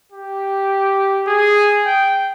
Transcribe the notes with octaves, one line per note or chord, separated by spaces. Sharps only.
G4
G#4
G5